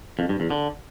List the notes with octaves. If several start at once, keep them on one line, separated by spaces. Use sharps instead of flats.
F2
G2
E2
D3